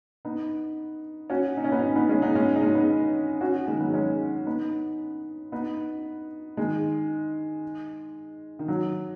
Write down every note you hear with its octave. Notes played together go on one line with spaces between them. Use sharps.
B3 D#4
C#4 F#4
D#4
C#4
B3 D#4
B3 D#4
G#3 C#4
B3 D#4
G#3 C#4
D#4
G#3 C#4
B3 D#4
C#4 F#4
D#3 G#3
F#3 B3
G#3 C#4
B3 D#4
B3 D#4
D#3 G#3
D#3
F#3